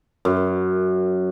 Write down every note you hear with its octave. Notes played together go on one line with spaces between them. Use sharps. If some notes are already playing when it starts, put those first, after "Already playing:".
F#2